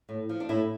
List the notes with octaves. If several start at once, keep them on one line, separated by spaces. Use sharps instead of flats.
A2
F3
D4
A2 E4